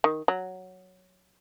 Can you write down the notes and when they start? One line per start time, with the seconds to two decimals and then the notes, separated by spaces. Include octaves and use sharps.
0.04 D#3
0.28 F#3